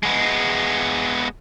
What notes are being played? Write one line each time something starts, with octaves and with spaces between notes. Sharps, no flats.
G#3 B3